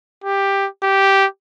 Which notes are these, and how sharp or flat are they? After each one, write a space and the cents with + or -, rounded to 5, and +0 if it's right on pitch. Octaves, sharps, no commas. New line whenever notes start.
G4 +10
G4 -5